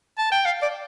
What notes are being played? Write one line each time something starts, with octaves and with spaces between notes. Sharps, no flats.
A5
G5
F5
D5